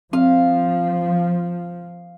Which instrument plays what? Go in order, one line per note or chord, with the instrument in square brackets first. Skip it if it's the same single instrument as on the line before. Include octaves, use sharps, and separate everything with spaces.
[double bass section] F3 [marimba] C4 [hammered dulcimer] F5